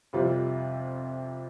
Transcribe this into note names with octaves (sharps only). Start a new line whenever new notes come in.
F2 C3 G3 C4 F4